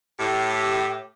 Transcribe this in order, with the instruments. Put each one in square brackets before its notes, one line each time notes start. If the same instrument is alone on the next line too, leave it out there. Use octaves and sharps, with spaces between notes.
[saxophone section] A2 G4